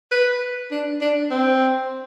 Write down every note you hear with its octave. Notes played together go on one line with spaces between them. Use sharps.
B4
D4
D4
C4